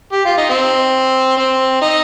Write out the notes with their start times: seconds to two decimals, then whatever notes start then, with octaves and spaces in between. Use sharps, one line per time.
0.13 G4
0.25 F4
0.37 D#4
0.50 C4
1.37 C4
1.82 D#4